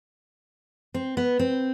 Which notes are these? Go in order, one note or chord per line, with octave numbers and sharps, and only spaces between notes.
C4
B3
C4